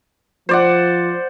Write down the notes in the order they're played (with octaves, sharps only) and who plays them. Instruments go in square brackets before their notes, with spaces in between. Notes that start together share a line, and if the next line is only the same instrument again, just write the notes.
[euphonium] F3 [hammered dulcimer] C5 D5 F#5